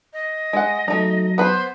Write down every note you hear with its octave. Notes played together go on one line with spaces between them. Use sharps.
D#5
G#3 F#5
F#3 A3 D#4
B3 B4 C5